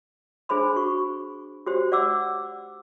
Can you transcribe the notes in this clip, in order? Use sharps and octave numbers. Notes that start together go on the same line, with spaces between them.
D4 G#4 C5 B5 C6
F#4 C#6
F#4 G4 C5
D5 F#5 D6 E6